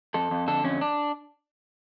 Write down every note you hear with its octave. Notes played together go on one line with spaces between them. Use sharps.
F2 A4
F2
D3 A4
F2 C#4
D4